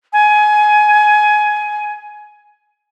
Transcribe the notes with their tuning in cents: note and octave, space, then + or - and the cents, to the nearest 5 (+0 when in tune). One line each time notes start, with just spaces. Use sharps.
G#5 +20